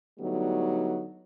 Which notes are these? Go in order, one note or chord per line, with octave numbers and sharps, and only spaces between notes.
D3 F#3 G3 A3 B3 D#4